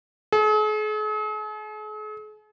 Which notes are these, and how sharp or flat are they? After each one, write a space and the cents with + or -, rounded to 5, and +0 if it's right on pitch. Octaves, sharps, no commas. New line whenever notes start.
G#4 +45